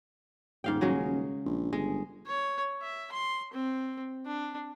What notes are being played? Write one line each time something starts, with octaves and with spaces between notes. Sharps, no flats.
D#1 G#2 F5 G5
C#3 F#3 G#3
A#1
G1 G#3
C#5
E5
C6
C4
D4